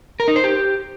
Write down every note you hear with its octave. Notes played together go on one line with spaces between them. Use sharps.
A#4
D#4
C5
G4